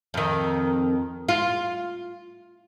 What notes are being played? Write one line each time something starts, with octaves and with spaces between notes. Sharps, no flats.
F2 D#3
F4